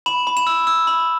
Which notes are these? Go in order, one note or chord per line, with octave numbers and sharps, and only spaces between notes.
B5 E7
B5
E7
E6
E6
B5